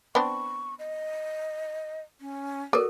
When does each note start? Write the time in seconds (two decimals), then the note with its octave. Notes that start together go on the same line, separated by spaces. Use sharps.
0.15 B3 C4 D4 B5 C#6
0.79 D#5
2.21 C#4
2.73 F#4 A4 A#4 D5